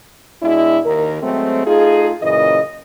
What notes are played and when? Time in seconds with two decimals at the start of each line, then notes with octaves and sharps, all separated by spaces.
0.42 B2 G#3 D4 E4
0.86 D#2 D#3 A#4
1.22 F#3 G#3 A3 C4
1.66 A3 D#4 F4 G#4
2.23 F#2 A#2 C#3 E3 D#5